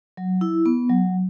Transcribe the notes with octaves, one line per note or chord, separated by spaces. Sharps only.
F#3
E4
B3
F#3